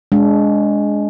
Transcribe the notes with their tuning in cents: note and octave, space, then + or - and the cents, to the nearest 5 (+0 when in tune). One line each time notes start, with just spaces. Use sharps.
G#3 +0 D4 -25